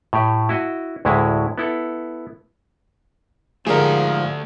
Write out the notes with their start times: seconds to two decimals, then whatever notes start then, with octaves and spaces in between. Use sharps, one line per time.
0.13 A2 G4
0.49 E4 F#4 D#5
1.05 D2 A2 G#3 E4
1.58 B3 E4 A4
3.67 G#2 D3 F3 A3 G4 G#4 A#4 D5